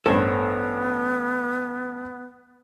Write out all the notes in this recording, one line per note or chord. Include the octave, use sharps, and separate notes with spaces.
A1 G2 B3 A4 C5 C#5